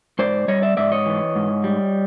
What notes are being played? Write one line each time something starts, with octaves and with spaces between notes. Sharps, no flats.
G#2 C5 D5
G3 C#5 D#5
D5 E5
G#2 D5 E5
C#5 D#5
E3
G#2
G3